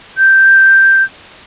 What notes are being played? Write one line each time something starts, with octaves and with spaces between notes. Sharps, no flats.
G6